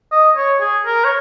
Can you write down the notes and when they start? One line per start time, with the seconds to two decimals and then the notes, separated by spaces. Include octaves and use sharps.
0.12 D#5
0.37 C#5
0.61 G#4
0.86 A#4
1.04 C#5